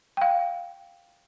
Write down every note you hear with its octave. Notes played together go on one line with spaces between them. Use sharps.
F5 G5